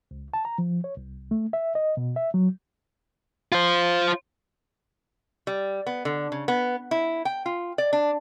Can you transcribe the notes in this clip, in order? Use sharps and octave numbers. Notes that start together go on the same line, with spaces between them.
C#2
A5
A#5
F3
C#5
C2
A3
E5
D#5
B2
E5
F#3
F4 C5
G3
B3
D3
C#3
B3
E4
G5
F4
D5
D4